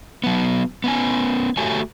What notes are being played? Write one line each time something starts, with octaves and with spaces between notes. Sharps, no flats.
F#3 B3
B3 C#4 G#5
A3 F#4 G4 C#5 G#5